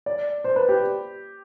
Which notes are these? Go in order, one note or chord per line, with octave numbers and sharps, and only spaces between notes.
D5
C5
B4
G4